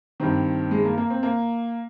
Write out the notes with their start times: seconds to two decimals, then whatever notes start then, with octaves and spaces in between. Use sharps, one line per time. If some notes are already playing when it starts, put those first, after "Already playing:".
0.20 G2 D#3 C4
0.71 G#3
0.85 A#3
0.98 A#3
1.10 C4
1.23 A#3